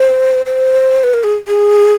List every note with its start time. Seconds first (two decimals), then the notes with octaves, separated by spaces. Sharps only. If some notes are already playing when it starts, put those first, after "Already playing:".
Already playing: C5
0.46 C5
1.04 B4
1.14 A#4
1.24 G#4
1.48 G#4